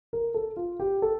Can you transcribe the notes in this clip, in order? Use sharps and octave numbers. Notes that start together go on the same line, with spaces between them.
A#4
A4
F4
G4
A4